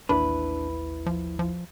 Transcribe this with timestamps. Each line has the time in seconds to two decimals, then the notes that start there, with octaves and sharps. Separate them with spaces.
0.09 A1 D#2 D4 E4 B4
1.06 F3
1.39 F3